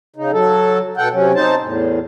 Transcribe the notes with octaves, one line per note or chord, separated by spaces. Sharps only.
C#3 D#4
F#3 A4
B2 A4 F#5 G5
C3 F#3 C#4
C4 D#4 C5 A5
E2 A2